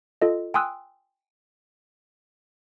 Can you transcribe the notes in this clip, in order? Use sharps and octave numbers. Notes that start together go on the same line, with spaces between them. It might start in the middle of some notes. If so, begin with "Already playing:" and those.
F4 A4 D#5
G5 G#5 C6 D#6 E6 F#6